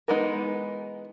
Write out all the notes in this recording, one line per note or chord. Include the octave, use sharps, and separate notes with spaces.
E3 G#3 B3 D#4 A#4